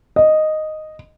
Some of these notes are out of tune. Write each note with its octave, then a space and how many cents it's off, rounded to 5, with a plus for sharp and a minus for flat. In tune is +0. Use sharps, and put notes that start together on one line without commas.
D#5 -5